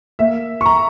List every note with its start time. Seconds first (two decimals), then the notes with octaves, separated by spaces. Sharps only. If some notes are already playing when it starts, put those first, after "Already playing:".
0.19 A#3 E5
0.61 C#6
0.66 A#5